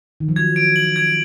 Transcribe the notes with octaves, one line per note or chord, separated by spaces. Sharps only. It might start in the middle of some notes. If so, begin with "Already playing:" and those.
D#3
F3
F#3 G#6
D7
F#7
G#6